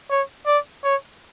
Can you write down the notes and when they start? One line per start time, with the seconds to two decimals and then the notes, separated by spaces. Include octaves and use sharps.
0.11 C#5
0.47 D5
0.84 C#5